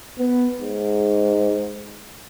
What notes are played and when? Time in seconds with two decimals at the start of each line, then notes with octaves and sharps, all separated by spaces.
0.19 B3
0.60 G#2